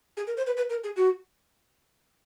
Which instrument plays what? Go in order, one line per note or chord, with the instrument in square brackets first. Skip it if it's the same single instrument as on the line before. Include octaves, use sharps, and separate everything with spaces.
[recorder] G#4
A#4
C5
B4
B4
A#4
G#4
F#4